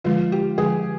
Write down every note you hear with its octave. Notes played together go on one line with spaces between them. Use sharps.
D3 F3 G#3 F4
G4
D3 F3 G#3 G#4